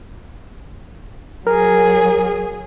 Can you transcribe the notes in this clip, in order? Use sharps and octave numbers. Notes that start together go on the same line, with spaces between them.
F#3 G#4 A#4